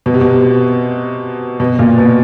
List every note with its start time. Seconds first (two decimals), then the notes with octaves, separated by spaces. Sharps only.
0.06 B2
0.14 C3
0.21 B2
1.60 B2
1.79 A#2
1.98 B2